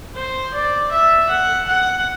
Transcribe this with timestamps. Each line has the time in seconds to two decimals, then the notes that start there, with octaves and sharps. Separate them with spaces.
0.15 C5
0.54 D5
0.91 E5
1.29 F#5
1.68 F#5